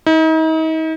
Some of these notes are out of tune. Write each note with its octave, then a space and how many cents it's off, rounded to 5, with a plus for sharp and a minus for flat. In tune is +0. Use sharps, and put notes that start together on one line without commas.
D#4 +40